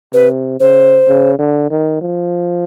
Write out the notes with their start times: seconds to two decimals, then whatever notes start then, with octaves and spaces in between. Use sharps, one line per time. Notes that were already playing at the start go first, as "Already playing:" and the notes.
0.13 C3 B4
0.60 C#3 C5
1.08 C#3
1.39 D3
1.70 D#3
2.01 F3